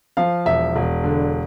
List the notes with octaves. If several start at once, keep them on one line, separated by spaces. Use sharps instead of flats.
F3 F5
E1 E5
E1
D3